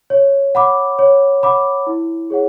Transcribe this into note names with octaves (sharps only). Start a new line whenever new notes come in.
C#5
F#5 B5 D6
C#5
F#5 B5 D6
E4
G#4 C#5 F#5